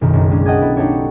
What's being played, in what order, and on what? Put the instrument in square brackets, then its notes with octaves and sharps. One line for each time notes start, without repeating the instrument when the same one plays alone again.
[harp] F#1 B1 D#3
F#1
F#3 G#3 C#4 D4
D#5 F#5 G5 A5 D#6 G#6
B3 E4 A4
D4 D#4 G4 A4 C#5